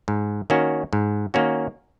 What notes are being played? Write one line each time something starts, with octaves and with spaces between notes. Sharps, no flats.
G#2
D#3 A#3 C#4 F#4
G#2
D#3 A#3 C#4 F#4